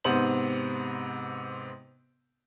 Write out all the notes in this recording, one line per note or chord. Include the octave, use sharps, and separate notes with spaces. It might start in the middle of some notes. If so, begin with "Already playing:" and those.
G#2 C3 B3 C5 F#7